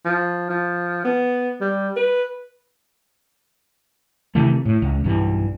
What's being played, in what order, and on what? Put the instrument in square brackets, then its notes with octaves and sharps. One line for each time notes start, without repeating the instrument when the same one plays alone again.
[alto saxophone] F3
F3
B3
G3
B4
[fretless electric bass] C3 D#3 E3 A3
A2
C#2
B1 G2 E3